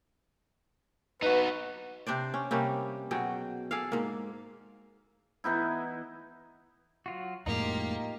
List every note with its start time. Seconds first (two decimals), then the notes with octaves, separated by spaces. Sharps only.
1.22 D#4 F#4 B4
2.07 C3 D4 C5 D5
2.34 C#4
2.51 C3 G3 A#3 C#4
3.11 B2 F#3 G#4 G5
3.71 G#4 A4 D5 F5
3.92 G#2 A#3
5.44 E3 B3 D#4 E4
7.06 F#3 F4 F#4
7.46 F2 A2 G#3 A#3 D#4 F4 G4